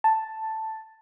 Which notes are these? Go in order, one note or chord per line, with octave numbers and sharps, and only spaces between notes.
A5